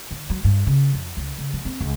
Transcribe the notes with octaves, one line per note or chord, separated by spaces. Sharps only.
D3
F#3
G2
C#3
F2
C#2
C#3
F3
C4
C#2